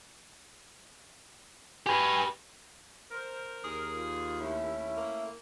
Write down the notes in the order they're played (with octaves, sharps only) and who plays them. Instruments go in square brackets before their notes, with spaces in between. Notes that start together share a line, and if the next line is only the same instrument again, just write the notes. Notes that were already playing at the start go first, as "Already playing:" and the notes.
[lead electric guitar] G4 B4 [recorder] G#5
[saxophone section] A#4 [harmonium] C5
[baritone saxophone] D#2 [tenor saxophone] G#4
[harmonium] F4
[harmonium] A3 [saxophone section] C#4 E4
[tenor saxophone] A#3